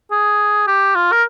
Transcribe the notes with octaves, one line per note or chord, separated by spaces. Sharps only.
G#4
G4
F4
A#4